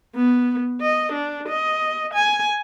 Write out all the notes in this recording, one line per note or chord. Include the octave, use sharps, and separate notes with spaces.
B3
D#5
D4
D#5
G#5